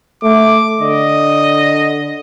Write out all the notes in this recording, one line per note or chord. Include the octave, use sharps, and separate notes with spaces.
A3 D6
D3 D#5